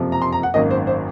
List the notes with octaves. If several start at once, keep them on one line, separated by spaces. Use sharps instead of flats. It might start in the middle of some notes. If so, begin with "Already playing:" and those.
Already playing: F#1 F2 C3 F3
A#5
C6
A#5
F#5
G#1 F#2 D#3 A#3 D#5
C5
C5